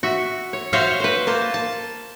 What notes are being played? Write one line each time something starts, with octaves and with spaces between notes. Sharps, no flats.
F#4 E5
C#5
F#4 C5 C#5 E5 F5
B4 C5
A#3 C5 A5
A5